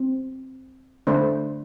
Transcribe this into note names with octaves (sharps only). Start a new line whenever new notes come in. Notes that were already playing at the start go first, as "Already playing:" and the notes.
Already playing: C4
D3 A3 D4 A4 C5